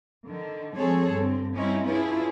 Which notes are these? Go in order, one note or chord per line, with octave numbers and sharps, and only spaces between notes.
D3 D#3
F3 G#3 C4 G#4 A4 C#5
G2 D3 C4
G3 C4 C#4 D#4 E4
C#4 D4 E4 F4 G#4 B4